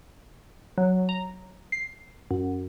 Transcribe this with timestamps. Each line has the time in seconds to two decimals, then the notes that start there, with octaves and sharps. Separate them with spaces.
0.78 F#3
1.09 A#5
1.72 C7
2.31 F#2